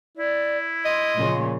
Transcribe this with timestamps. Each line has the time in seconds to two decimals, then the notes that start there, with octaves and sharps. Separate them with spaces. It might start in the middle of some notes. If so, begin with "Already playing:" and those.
0.17 E4 D5
0.85 D#5 C6
1.17 A#2 C#3 F3